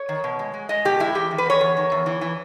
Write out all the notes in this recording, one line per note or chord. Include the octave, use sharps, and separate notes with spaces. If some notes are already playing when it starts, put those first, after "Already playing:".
Already playing: C#5
D#3
B2
G#3
G#3
G#3 D#5
B2 G4
G#3 E4
E2 G4
D#3
B4
E2 C#5
E2
D#3
E2
E3
E3